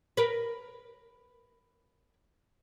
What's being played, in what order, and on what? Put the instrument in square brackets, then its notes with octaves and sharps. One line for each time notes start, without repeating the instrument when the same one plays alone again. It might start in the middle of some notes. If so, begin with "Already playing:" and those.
[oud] A#4 B4